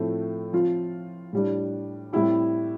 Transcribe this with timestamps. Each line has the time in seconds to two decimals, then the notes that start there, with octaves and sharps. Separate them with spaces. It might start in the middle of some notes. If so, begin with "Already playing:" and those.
Already playing: A2 F3 A3 C4
0.53 F3 C4 F4
1.33 A2 G3 D4
2.13 A2 G3 C4 E4 G4